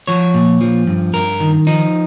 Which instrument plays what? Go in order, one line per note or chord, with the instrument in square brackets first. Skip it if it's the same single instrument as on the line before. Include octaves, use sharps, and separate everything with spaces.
[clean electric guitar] F3 C#5
A#2
F3
G2
G2 A#4
D#3
F3 D#4